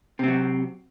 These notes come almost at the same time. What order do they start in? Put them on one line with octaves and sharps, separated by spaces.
C3 C4 F#3